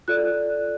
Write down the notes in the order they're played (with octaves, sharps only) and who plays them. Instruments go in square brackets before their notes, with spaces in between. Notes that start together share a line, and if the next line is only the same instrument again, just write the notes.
[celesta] F4 A4 D5 F#6